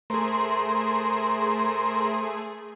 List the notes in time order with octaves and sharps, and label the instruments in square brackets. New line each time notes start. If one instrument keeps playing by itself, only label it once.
[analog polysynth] A3 G#4 [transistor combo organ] A#4 C5